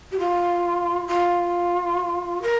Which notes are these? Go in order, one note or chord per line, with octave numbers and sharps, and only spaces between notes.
G4
F4
F4
A#4